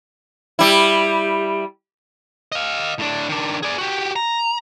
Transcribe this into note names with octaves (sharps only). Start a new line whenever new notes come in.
G3 E4
D#5 F5
A2 D4
D#3 D4
G#4 D5
F#4 G4
A#5